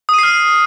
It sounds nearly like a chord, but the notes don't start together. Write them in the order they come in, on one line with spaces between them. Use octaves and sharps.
D#6 D#7 C7 F6